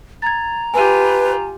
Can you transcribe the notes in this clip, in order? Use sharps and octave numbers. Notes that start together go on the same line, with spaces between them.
A#5 G#6 A6
F4 G4 B4 G#5 D#7